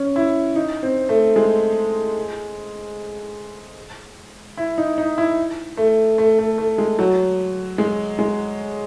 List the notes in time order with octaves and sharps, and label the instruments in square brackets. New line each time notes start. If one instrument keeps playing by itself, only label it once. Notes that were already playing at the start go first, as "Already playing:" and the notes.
Already playing: [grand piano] C#4
E4
D#4
C4
A3
G#3
E4
D#4
D#4
E4
A3
A3
A3
A3
G#3
F#3
G#3
G#3